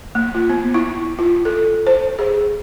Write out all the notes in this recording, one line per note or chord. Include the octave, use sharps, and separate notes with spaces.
A#3
F4
B3
E4
F4
A4
C5
G#4